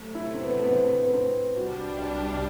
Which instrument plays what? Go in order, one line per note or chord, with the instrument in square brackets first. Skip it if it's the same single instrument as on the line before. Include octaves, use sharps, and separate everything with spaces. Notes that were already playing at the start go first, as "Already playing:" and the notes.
Already playing: [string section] C3 F#3 A3
[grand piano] E4
C4
B3
B3
C4
B3
C4
[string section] C2 C3 G3 D4 [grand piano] F#4
[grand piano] D5
D5